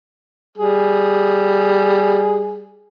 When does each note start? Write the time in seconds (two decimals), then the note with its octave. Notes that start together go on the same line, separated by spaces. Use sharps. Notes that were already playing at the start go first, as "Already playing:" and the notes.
0.58 G3 G#4